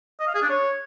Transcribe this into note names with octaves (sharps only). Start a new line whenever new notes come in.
D#5
F5
G#4
D4
C#5